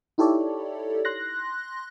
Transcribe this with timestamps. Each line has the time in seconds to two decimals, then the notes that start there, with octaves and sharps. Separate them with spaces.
0.18 D#4 E4 G4 A4 C#5 D5
1.05 C6 F#6 A#6